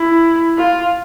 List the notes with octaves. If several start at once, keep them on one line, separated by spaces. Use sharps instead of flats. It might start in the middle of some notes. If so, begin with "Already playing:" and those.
Already playing: E4
F4